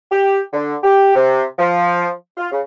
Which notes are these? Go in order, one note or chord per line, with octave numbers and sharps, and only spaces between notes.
G4
D3
G4
C3
F3
F4
C#3